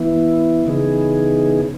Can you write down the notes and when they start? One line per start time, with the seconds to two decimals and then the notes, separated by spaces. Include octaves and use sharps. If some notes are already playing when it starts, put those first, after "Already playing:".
Already playing: E3 B3 E4
0.67 C#3 E3 B3 D#4 G#4